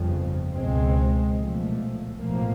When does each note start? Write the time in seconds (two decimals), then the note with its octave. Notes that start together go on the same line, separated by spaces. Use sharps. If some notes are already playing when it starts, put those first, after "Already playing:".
Already playing: G1 F2 C#3 F3
0.53 C#2 B2 G#3 C4
1.36 B1 A#2 F3 A3
2.18 B1 A2 F3 A#3